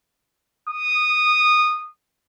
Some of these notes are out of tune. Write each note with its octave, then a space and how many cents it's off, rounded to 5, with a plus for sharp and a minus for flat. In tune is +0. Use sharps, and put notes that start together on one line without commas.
D#6 -15